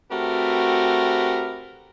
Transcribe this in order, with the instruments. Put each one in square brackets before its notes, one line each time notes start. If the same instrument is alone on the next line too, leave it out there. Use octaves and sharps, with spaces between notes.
[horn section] A3 C4 F#4 G4 A#4 B4